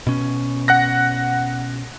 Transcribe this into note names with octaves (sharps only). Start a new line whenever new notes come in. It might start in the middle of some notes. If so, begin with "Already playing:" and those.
B2 C#4
F#5 F#6 A#6